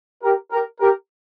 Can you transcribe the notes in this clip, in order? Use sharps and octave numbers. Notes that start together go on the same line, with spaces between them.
G4 A#4
G4 A#4
G4 A#4